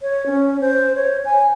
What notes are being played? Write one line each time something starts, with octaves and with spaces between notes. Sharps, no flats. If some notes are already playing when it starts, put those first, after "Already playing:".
C#5
C#4
C5
C#5
G#5